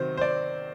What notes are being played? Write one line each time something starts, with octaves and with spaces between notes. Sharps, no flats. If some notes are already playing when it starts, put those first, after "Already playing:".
Already playing: C3 D#3 F#3 C5
C5
D5